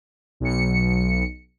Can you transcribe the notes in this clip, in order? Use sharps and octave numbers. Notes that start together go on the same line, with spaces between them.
B1 C#7